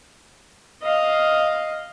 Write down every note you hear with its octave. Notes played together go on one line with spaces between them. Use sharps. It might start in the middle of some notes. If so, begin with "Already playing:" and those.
D#5 F5